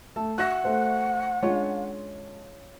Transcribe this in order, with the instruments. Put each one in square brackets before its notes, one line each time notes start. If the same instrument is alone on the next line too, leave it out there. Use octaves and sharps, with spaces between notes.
[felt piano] A3 [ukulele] A4
[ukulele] F#4 E5 [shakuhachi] F#5 [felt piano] F#6 A#6
[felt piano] A3 C5
[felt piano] G#3 D4 [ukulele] C#4 F4 C#5